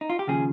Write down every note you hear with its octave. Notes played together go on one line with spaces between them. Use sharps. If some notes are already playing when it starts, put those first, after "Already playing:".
D#4
F4
G4
D#2 C#3 F3 G#4